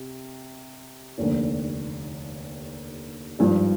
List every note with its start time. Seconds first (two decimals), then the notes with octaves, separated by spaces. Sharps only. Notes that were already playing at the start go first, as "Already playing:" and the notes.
Already playing: C3
1.18 F1 D#2 D3
3.39 G#1 G2 F3